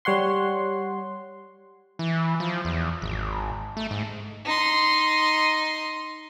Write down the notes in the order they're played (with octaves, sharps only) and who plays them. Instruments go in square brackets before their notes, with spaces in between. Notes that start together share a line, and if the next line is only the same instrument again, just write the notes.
[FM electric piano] G3 C#5 F#5 C6
[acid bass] E3
F3
E2
G#1
A3
G#2
[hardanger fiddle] D#4 C6